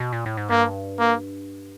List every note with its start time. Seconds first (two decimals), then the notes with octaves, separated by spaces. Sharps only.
0.00 B2
0.12 A#2
0.26 A2
0.37 G#2
0.50 G2 A#3
0.99 A#3